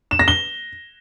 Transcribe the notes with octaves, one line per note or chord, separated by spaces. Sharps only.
E7
A#6
G7